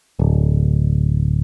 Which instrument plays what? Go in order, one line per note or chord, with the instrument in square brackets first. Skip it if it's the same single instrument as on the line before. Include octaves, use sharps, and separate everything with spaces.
[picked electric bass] D1